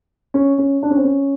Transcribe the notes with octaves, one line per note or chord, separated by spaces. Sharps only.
C#4
C#4
D4
C#4
C4
C#4